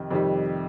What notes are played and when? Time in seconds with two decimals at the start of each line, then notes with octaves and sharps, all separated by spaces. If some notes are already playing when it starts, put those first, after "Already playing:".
Already playing: F2 C3 D#3
0.11 F2 C3 D#3 G3